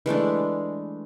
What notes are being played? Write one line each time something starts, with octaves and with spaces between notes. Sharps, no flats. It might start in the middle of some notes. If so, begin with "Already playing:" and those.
E3 G#3 A3 D4